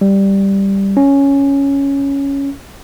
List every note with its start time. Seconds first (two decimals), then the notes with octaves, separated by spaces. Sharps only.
0.01 G3
0.97 C#4